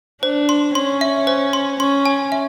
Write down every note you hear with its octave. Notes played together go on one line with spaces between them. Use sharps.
D4 C5
C6
C#4 C6
E5
C5
C6
C#4 C6
G#5
E5